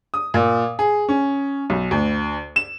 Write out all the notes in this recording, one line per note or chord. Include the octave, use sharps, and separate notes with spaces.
D#6
A#2
G#4
C#4
B1
D2
E7